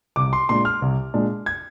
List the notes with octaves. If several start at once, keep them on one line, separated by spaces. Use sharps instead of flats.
C2 D6
C6
A#2 G#3 D4 C6
F6
C2
A#2 G#3 D4
G#6